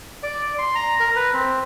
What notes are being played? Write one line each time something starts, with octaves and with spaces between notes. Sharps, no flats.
D5
C6
A#5
A#4
B4
C4